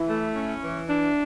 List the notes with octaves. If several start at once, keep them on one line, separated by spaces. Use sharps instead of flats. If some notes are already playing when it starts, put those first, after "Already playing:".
Already playing: E3 E4
A3
C#4
E3
D4